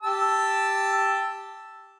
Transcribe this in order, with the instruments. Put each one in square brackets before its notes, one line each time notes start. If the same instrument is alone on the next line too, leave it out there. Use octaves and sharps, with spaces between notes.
[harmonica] G4 A5 E6